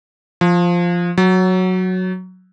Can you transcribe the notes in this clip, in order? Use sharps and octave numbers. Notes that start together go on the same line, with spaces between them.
F3
F#3